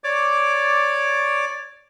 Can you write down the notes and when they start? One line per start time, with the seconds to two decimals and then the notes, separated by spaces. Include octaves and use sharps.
0.04 C#5 D5 D6